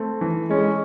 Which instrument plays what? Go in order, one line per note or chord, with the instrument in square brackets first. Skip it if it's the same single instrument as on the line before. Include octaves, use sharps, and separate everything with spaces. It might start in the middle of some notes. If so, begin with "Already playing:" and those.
Already playing: [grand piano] A3 C4
E3
[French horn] G#3 [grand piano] C#4